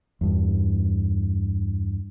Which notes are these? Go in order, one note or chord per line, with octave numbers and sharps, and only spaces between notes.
E2 G2